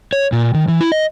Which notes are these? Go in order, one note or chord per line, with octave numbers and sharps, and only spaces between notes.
C#5
A#2
D#3
E3
E4
D#5